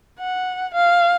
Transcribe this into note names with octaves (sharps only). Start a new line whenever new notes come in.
F#5
F5